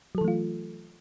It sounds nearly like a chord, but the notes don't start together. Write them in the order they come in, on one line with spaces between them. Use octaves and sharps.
F#3 A4 E3 A3 F4